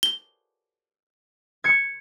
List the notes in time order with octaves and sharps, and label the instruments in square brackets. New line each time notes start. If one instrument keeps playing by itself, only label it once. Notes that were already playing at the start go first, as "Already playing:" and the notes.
[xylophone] G7
[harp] G#6 C#7